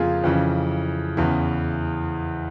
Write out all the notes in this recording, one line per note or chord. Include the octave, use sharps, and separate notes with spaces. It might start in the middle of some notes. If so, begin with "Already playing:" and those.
Already playing: F2 C#3 F3 A#3 C4 F4 G#4
F2 C#3 E3
E2 C#3 E3